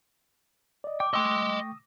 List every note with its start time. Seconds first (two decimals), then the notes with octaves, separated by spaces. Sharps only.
0.84 D5 D#5
1.00 G5 D6
1.14 A3 D#5 G5 C6 C#6 D#6 E6